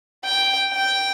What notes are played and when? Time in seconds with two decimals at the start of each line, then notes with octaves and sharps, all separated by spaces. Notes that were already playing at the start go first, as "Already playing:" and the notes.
0.25 G5
0.72 G5